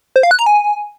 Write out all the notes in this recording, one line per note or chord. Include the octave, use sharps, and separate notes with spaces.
C5
F5
F#6
A#5
G#5